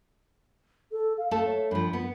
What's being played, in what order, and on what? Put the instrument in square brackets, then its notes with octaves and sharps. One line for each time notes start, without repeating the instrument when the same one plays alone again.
[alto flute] A4
F5
[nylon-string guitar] A3 A4 A5 [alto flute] F5
[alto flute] C#5
[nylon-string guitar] G2 F3 [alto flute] B5
[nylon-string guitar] B3 [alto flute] B4